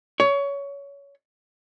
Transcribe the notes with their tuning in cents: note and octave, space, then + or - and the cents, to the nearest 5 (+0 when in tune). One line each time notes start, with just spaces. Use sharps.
C#5 +20